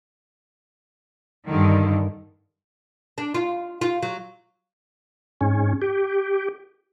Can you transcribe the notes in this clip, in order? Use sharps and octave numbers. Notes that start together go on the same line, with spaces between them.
G2 D3 D#3
D4
F4
F4
F#3
G#2 C#4
G4